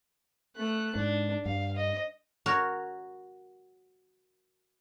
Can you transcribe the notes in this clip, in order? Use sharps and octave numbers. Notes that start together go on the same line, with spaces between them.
A3 F#6
G#2 D4
G2 F5
D#5
F#4 A#4 C#5